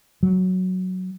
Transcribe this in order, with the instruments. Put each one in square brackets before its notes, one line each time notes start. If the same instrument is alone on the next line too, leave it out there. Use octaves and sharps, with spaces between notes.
[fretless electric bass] F#3